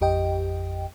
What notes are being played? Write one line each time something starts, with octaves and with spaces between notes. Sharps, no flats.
A1 F2 G4 D#5 G5